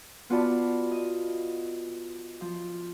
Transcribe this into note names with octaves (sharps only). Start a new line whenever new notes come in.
B3 F4 F#4 D5 A5 B5
D#5
F3